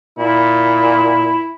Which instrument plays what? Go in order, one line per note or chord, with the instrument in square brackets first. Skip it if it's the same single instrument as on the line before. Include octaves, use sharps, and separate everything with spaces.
[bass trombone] A#2 [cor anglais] E4